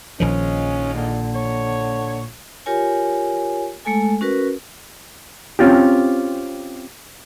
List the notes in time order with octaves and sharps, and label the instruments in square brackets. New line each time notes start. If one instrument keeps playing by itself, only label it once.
[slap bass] A#1 D#3 F3 [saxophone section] G#3 D#4 F4 [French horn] C#4
[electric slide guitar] A#2 [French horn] D3
[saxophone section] C#5
[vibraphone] F4 G4 A#4 C#5 G#5
G#3 A3 A4 G#5
C#4 F#4 A#4 B4
[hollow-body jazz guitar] C4 C#4 F4 G4